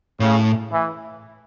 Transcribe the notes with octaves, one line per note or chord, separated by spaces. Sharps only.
A2 C#3
E3